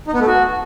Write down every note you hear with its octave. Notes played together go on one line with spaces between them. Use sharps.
D#4
B3
A3
F#4